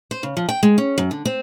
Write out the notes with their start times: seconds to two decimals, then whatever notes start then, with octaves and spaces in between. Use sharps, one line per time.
0.11 C5
0.23 C#3
0.37 F3
0.49 G5
0.63 G#3
0.78 C#4
0.98 F#2
1.11 D3
1.25 C4